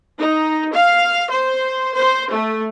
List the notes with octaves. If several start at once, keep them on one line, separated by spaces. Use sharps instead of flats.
D#4
F5
C5
C5
A3